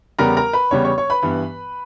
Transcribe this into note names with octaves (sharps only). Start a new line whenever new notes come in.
E2 C#3 G3 B3 A#4 A#5
A#4 A#5
B4 B5
E2 C#3 G3 B3 C#5 C#6
C#5 C#6
C#5 C#6
B4 B5
G2 E3 B3